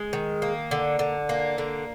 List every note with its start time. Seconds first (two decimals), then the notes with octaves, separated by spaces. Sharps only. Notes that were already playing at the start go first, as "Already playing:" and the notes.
Already playing: G#3
0.13 D#3
0.42 A#3
0.71 D3
0.99 D3
1.29 A#3
1.58 D3